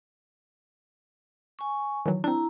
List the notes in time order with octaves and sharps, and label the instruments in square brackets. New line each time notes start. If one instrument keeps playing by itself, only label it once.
[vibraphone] G#5 C#6
[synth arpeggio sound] D#3 E3 F#3
[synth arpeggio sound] C4 D4 [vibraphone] E4 A#5